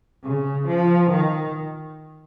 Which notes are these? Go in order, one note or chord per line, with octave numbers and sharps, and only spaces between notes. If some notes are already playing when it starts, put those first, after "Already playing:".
C#3
F3
D#3